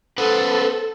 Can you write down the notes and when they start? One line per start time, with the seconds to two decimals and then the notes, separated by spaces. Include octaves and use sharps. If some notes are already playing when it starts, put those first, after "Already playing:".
0.18 A4 B4 C5 F#5